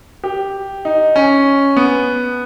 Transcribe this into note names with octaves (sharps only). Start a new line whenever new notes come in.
G4
D#4
C#4
B3